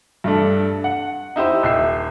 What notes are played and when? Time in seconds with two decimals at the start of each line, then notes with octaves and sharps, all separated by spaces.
0.24 G2 A3 D4
0.84 F#5
1.36 D#4 E4 G4 C5
1.63 D#1 E5 C7